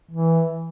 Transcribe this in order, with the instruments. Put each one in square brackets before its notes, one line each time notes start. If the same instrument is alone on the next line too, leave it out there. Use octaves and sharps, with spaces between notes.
[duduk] E3